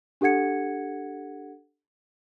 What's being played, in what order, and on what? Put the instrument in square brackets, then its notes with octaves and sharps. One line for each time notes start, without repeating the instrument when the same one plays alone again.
[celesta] D4 G4 A4 F#5 G#6 C#7